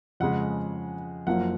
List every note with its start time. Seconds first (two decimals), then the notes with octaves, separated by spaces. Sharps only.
0.20 F2 C#3 G#3 F#5
1.27 F#1 F#2 F3 A#3 F#5